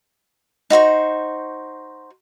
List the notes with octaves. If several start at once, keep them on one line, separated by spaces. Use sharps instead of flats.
D#4 F#4 C5 C#6